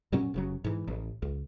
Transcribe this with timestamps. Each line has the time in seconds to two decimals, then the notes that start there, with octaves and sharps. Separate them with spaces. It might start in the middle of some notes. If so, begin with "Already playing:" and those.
0.12 F#2 A#2 F#3 C#4
0.34 F1 C#3 F#3
0.64 G#2 E3
0.87 A1
1.22 C#2